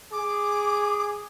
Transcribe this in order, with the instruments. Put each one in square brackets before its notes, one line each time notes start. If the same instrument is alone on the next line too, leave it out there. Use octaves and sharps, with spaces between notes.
[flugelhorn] G#4 [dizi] D6